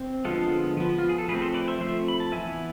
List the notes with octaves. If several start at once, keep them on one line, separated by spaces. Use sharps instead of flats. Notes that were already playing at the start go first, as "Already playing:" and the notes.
Already playing: C4
D3 F3 G#3 B3 F4 A4
F3 B3
F4
G#4
A4
F3 A3 C4 G#4 B4
A4 C5
B4 D5
C5 E5
F3 A3 C4 C5 E5
B5
A5
E3 B3 E5 G#5